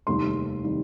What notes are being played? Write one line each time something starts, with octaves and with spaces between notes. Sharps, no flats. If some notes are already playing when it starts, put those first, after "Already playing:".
F1 D#2 D#3 G3 C6
D#3 G3